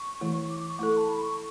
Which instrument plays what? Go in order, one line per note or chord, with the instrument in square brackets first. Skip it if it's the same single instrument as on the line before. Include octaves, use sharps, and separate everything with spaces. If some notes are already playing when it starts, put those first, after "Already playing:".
Already playing: [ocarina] C#6
[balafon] E3 A3 E4
[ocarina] D6
D6
C#6
[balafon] A3 E4 A4 [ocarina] C#6
[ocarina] A5
B5
C#6